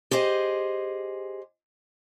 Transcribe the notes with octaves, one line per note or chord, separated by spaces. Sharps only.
G4 G#4 C5 D#5